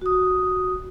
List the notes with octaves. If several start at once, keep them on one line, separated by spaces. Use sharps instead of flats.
F#4 D#6